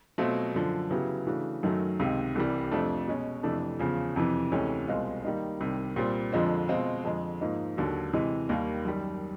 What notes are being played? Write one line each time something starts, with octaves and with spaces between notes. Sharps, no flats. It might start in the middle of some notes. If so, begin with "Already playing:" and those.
B2 F#3 A3 C4 F4
F#2 D3 F3
C#3 F#3 B3 E4 G4
C#3 E3 A3 D4 F#4
F#2 D#3 F#3 A3
C#2 C3 D#3
C2 C3 E3 G3
F2 C3 F3 A3 D4
B2 G#3 C#4
F2 C3 E3 A3 D4
E2 C#3 F3
F2 C3 E3
D2 C3 E3 G#3 C#4
C2 B2 G#3 C4 F4
D#3 G3 A#3 D#4
C2 C3 D#3 G3
A#2 G3 C4
F2 D3 F3 G#3 C4
B2 G#3 C4 F4
F2 D3 F3 G#3
G#2 F3 A#3 D#4
D#2 D3 F#3
C3 E3 G#3
D#2 D#3 G3 A#3
F#2 D#3 G3